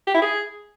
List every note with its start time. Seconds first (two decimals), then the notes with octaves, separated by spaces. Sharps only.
0.07 G4
0.15 E4
0.22 G#4